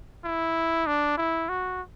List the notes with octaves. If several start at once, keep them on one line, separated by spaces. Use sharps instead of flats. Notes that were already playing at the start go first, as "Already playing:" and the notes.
E4
D4
E4
F#4